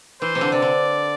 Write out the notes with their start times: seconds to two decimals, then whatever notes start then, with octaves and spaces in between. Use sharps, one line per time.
0.21 E3 C5
0.35 C3
0.41 D3
0.52 C3 D5
0.62 D3